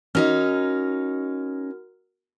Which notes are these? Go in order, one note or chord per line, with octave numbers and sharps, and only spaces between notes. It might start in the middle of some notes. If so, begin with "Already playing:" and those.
C#4 D#4 F#4 A#4 D#5 F6